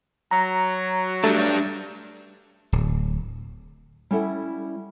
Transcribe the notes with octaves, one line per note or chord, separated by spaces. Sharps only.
F#3 A#5
G3 A3 D4
D1
G3 C#4 E4 A4 E5 F#5